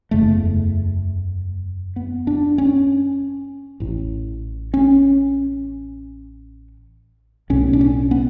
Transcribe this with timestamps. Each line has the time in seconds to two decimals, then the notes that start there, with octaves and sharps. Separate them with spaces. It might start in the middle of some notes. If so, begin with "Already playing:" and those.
0.11 F#1 E2 C#3 A3
1.96 B3
2.27 D4
2.58 C#4
3.80 A1 A2
4.74 C#4
7.50 B1 A2 C#4
7.73 D4
7.81 C#4
8.11 B3